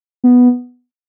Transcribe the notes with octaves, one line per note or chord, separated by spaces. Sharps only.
B3